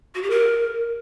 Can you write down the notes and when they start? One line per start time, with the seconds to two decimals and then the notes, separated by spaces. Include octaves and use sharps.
0.14 F#4
0.22 G4
0.30 A#4